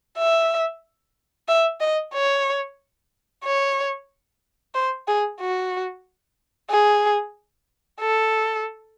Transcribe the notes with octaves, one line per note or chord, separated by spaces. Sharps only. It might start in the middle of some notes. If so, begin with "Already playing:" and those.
E5
E5
D#5
C#5
C#5
C5
G#4
F#4
G#4
A4